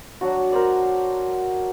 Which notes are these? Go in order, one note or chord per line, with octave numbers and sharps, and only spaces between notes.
F#3 D4 F#4
A#4 C5 D5